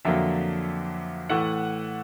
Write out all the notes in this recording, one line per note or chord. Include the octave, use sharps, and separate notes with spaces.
F2 D3 F#3 A#3 E5
A2 E3 A3 F#5